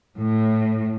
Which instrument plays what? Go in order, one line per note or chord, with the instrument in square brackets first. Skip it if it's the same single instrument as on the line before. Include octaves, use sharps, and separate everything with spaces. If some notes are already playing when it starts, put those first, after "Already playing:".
[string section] A2